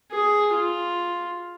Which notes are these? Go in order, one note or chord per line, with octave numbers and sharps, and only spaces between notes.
G#4
F4